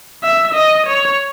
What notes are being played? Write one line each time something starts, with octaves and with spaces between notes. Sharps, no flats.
E5
D#5
C#5